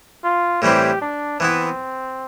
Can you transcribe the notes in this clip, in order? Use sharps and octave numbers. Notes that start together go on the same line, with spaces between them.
F4
A2 E3 G3 C4 E4 G4
D4
E3 B3 C4 E4